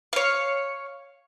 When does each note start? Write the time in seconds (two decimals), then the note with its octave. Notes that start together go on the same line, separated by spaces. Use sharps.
0.13 C#5 F5